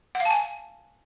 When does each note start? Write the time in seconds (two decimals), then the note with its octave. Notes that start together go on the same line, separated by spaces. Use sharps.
0.15 F#5
0.20 F5
0.25 A5
0.31 G#5